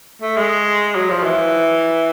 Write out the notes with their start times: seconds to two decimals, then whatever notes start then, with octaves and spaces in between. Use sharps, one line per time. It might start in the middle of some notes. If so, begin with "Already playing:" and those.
0.22 A3
0.37 G#3
0.96 F#3
1.10 F3
1.24 E3